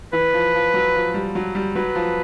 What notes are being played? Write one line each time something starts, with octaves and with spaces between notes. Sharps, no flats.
E3 B4
F3
F3
F#3
F3
G3
F#3
G3
F#3 B4
F3